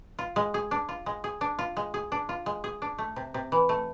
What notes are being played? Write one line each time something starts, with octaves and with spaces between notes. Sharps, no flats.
F4
G#3
G#4
D4
F4
G#3
G#4
D4
F4
G#3
G#4
D4
F4
G#3
G#4
D4
A3
C3
C3
E3
A3